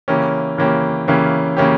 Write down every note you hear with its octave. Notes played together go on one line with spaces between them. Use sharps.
C#3 E3 A#3 C#4 G4
C#3 E3 A#3 C#4 G4
C#3 E3 A#3 C#4 G4
C#3 E3 A#3 C#4 G4